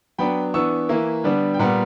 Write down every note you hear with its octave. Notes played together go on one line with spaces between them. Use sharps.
F#3 B3 D4 G5 B5
E3 B3 D4 C#6 E6
E3 A#3 E4
D3 G3 B3 D4
G5
A#2 G3 B3 F#5 A#5